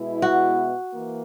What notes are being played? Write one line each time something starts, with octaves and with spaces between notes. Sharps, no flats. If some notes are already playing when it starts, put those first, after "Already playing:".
Already playing: B2 G#3 B3 E4
F#4
E3 A#3